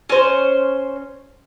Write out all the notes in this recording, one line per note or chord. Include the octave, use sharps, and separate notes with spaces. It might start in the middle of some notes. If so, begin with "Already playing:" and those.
C#4 C5